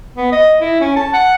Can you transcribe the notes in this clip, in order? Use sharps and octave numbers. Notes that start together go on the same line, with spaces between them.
B3
D#5
E4
C#4
A5
F#5